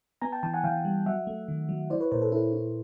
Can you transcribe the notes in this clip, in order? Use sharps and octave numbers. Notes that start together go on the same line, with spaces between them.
B3 G#5 A#5
G5 A5
E3 G5 A5
F#5 G#5
E3 F5 G5
G3
F#3 E5 F#5
A3
D#3
F#3
E4 C5 D5
B4 C#5
A#2 A#4 C5
A4 B4
E4 A4 B4
E4